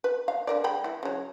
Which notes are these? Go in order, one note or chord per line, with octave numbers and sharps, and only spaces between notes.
B4
F5
D3 A#4 D5
G#3 G5 B5
E3 E4
C#3 F#3